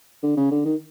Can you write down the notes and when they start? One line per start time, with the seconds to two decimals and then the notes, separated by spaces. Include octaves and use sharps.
0.23 D3
0.37 C#3
0.51 D3
0.65 D#3